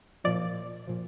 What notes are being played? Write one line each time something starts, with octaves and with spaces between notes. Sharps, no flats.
A#2 F3 D5
A#2 F3